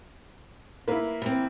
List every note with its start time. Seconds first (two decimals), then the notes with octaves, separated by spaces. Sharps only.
0.88 A#3 E4 B4
1.22 E3 C4